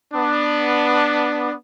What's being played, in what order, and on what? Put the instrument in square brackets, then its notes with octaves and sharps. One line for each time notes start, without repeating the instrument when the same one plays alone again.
[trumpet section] B3 D4